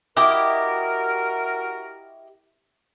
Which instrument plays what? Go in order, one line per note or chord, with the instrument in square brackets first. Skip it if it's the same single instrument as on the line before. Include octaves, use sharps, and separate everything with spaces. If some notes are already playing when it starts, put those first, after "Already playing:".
[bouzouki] E4 G4 D#5 [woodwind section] F#4 A#4